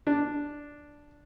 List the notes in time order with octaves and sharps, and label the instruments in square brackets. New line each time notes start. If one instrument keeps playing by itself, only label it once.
[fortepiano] D4